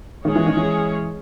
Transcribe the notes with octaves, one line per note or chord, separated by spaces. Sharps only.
D#3 G#3 C#4 G#4 C#5
E3
D#3
E3